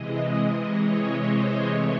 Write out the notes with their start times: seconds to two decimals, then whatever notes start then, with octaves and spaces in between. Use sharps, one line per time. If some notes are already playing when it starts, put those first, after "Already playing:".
Already playing: C3 E3 G#3 D#5
0.76 C#5
1.21 C5
1.66 C3 E3 A3 C#5